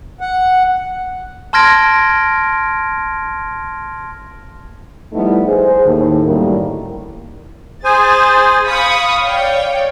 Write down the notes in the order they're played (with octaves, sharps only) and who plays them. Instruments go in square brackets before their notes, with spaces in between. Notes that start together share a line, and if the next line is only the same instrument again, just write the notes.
[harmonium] F#5
[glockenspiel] A5 C6 F6 G#6 A#6 D7
[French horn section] F3 G3 A3 B3 D#4 E4
G#4 C5
D#2 A2 D#3
F#2 A2 D3 D#3 G3 A#3
[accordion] G#4 C5 G#5 [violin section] A6
[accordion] F5 [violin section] B5 C#6 D#6
[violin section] C#5 D5 G5